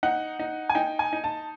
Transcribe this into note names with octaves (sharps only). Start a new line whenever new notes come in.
D#4 F#5
D#4
G#5
D#4 G5
G#5
D#4
A5